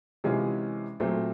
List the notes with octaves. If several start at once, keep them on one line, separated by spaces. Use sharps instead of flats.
C3 E3 G#3 C#4 F4
A#2 F#3 A3 C4